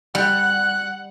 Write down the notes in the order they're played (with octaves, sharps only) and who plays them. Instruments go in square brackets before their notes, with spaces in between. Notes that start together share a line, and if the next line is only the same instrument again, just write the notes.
[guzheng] G3 [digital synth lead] F#5 [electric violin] F#6